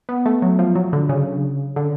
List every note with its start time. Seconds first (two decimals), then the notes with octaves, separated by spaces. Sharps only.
0.09 B3
0.26 A3
0.42 F#3
0.59 F3
0.75 F#3
0.93 D3
1.09 C#3
1.76 D3